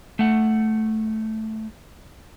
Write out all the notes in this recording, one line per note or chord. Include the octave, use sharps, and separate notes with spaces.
A3 F#5